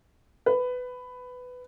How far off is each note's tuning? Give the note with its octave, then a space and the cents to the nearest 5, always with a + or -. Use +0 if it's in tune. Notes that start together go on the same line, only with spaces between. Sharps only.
B4 +15